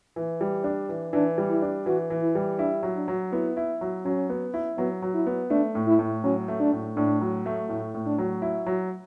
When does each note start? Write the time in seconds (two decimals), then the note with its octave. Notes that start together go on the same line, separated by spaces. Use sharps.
0.16 E3
0.41 G3
0.64 D4
0.89 E3
1.13 E3 D4
1.38 G3
1.50 E4
1.62 D4
1.86 E3 F#4
2.10 E3
2.22 E4
2.35 G3
2.59 D4 E4
2.83 F#3
2.96 D4
3.08 F#3
3.32 B3 E4
3.57 E4
3.81 F#3
4.05 F#3 C#4
4.29 B3
4.54 E4
4.78 F#3 B3
5.02 F#3
5.14 E4
5.27 B3
5.50 A3 D4
5.75 A2
5.87 E4
5.99 A2
6.24 F#3 C#4
6.48 A3
6.60 D4
6.72 A2
6.97 A2 D4
7.21 F#3
7.46 A3
7.69 A2 E4
7.94 A2
8.06 D4
8.18 F#3
8.42 E4
8.66 F#3